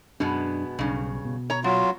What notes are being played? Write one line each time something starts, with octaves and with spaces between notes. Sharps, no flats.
F#2 B2 G#3 B3 D4
B1 G2 C#3
B2
C#5 A#5
F#3 B3 F4